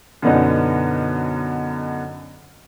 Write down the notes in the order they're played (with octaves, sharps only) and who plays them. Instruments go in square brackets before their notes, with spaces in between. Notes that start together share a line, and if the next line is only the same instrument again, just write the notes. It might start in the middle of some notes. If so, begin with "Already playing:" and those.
[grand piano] F#2 B2 D3 B3 C#4 D#4